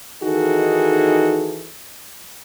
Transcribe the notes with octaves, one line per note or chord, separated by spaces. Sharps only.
D#3 E3 D#4 F#4 G#4 A4